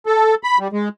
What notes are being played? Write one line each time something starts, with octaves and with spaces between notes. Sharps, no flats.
A4
B5
G3
G#3